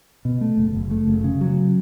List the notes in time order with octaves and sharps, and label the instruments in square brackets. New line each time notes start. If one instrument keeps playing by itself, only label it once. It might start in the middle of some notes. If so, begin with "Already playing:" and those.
[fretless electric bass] B2
A3
F#1
F#1
A3
F#1
C#3
F#3